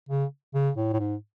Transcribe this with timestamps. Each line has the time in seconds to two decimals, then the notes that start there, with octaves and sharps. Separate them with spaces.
0.09 C#3
0.54 C#3
0.77 A2
0.93 A2
1.00 G#2